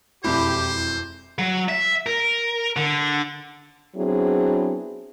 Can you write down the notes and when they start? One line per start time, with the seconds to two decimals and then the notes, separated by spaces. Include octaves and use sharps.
0.24 E1 F2 E4 G4 C5
1.39 F#3
1.69 E5
2.07 A#4
2.76 D3
3.96 F#3 B3 C4 D4 E4 G#4